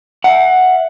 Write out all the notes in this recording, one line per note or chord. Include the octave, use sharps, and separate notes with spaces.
E5 F#5